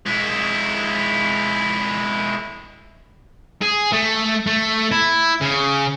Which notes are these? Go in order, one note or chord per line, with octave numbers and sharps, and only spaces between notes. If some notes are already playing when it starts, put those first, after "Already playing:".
G#3 E4
G#4
A3
A3
E4
C#3